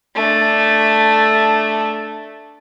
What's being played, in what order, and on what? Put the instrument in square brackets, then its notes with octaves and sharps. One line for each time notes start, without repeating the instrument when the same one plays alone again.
[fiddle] A3 D4